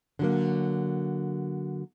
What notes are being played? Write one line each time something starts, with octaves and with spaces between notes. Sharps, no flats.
D3 F#3 A#3